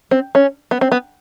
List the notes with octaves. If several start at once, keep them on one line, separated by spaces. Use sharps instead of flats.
C4
C#4
B3
C4
B3